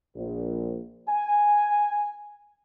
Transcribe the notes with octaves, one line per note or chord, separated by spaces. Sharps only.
A#1
G#5